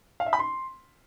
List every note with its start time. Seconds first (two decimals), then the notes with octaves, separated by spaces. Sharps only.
0.20 F5
0.26 E5
0.33 B5
0.39 C6